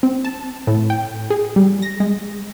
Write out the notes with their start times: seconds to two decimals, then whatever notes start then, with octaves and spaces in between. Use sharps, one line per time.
0.03 C4
0.25 A5
0.67 A2
0.90 G5
1.30 G#4
1.56 G3
1.82 A#6
2.00 G#3